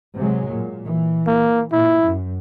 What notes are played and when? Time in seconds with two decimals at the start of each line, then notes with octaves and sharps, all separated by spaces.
0.15 C3 F#3 G#3
0.47 A#2
0.85 E3
1.27 A#3
1.72 A#2 E4
2.03 F#2